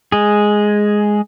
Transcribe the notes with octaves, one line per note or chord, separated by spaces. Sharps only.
G#3 G#4